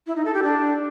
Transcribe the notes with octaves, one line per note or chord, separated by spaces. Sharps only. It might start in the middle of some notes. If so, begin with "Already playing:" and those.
E4
D#4
A4
G4
D4